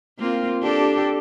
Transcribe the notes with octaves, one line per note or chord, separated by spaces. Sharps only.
A#3 C4 F4
D4 G4 A4